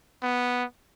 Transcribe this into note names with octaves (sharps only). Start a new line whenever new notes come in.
B3